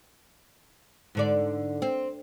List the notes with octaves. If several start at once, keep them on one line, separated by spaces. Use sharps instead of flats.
G#2 D3 D5
C4